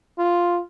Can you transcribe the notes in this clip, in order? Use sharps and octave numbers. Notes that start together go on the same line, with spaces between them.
F4